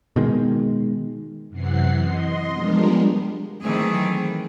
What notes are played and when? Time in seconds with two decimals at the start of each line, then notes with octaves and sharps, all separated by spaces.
0.16 B2 D#3 G#3
1.49 F#2 C3 E3 F#5 C7
2.01 D#5 C6
2.52 F3 G3 G#3 B3 D4 A#4
3.62 D#3 E3 F#3 A3 C4 G#4